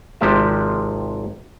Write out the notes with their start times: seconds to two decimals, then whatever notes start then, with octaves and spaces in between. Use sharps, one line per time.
0.21 G#1 C3 F3 G#3 G4 E5